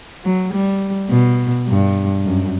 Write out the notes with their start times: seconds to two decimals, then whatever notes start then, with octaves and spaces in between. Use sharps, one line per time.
0.25 F#3
0.53 G3
1.10 B2
1.68 G2
2.25 F#2